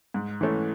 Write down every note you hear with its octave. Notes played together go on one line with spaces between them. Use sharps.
G#2
E3 A3 C#4